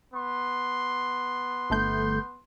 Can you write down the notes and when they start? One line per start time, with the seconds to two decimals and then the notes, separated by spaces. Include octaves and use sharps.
0.14 B3 C6
1.70 G1 A3 G6